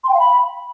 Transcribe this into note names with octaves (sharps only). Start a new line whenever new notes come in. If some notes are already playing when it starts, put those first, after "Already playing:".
C6
G5
F5
B5